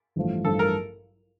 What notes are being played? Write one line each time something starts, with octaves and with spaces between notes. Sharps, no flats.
A1 G2 F3 A3
A1 G2 F3 A3 A4
A#4